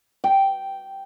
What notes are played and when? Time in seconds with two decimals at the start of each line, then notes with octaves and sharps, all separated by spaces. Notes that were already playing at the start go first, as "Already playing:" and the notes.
0.24 G5